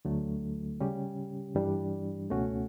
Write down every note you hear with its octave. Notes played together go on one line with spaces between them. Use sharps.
D2 D3 F#3 A3
C#3 G3 C#4 G4
G2 E3 G3 D4
C#2 B2 A3 C#4 F#4